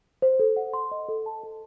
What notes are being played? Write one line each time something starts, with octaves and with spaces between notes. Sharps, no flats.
C5
A4
F#5
C6
D#5
A4
A5
A4